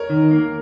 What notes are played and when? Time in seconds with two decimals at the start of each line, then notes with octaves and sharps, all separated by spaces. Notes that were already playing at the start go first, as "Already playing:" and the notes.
Already playing: A#4 C#5
0.10 D#3
0.31 A#3